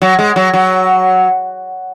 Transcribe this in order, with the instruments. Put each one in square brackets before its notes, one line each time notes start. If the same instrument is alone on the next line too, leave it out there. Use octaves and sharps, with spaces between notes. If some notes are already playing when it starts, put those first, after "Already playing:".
[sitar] F#3
G#3
F#3
F#3